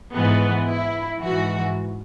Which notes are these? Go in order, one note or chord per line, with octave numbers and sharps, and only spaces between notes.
G#2 E3 B3
E4
G#2 E3 F#4